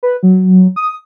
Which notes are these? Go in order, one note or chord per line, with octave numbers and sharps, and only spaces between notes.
B4
F#3
D#6